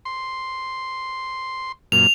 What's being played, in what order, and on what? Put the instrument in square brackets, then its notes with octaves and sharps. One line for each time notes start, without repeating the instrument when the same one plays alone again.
[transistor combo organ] C6
[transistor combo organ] F#2 A#2 [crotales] F7